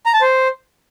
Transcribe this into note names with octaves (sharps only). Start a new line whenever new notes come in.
A#5
A5
C5